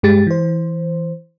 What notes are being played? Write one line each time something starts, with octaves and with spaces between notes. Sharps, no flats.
G2 G#3 G4 A6
E3 C5